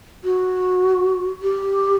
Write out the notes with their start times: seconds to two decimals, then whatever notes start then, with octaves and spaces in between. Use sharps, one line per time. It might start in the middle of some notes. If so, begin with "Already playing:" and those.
0.24 F#4
1.42 G4